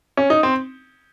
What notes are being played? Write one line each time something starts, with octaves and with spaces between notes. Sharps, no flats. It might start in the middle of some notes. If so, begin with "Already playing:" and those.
C#4
D#4
C4